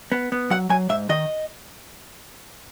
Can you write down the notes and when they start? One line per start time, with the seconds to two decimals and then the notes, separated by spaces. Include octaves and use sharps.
0.12 B3
0.32 B3
0.50 F#3 F#5
0.69 F#3 G#5
0.89 G#2 E5
1.09 D#3 D#5